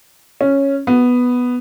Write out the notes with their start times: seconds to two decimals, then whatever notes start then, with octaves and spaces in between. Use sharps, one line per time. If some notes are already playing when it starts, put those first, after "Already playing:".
0.41 C#4
0.87 B3